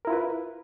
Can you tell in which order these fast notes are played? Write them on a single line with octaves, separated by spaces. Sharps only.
A#4 E4 F4 B4